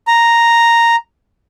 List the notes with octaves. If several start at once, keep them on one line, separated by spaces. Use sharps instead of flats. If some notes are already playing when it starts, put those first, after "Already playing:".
A#5